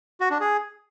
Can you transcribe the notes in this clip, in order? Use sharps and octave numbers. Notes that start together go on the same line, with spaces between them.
F#4
D4
G#4